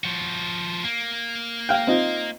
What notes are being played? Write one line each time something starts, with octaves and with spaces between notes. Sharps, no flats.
F3 F#4
A#3
F5 G5
C4 D#4 F4